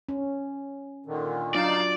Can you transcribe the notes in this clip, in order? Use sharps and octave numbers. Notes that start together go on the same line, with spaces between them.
C#4
A#2 D3 D#3
F#3 D4 D#4 F4 D5 F5 A5